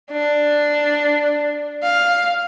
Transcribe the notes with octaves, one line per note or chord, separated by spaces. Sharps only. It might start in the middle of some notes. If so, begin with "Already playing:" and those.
D4
F5